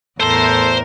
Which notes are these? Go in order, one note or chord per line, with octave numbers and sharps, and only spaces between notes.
E2 A2 A4 A#4 C5 C6